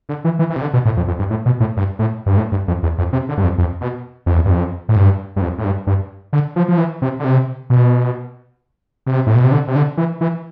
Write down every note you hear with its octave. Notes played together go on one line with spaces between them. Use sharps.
D3
E3
E3
E3
C3
D3
B2
A2
F2
F2
G2
A2
B2
A2
G2
A2
G2
A2
G2
F2
E2
F2
C3
D3
G2
F2
F2
B2
F2
E2
G2
F2
A2
G2
G2
F2
A2
G2
G2
D3
F3
F3
E3
C3
D3
C3
B2
C3
A2
B2
C3
D3
C3
D3
E3
E3